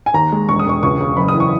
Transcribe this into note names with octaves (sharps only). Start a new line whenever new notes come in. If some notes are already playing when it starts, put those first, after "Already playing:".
G#5
D#2 A#5
G#3
E1 C#6
D#6
E1 C#6
C#2 C#6
C#3
F#1 B5
D#6
E3
C#6